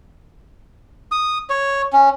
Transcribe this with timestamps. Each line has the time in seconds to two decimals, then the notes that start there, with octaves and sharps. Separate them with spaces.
1.12 D#6
1.50 C#5
1.93 C#4